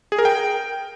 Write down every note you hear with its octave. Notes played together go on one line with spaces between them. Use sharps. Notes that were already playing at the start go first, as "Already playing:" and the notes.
G#4
A#4
G5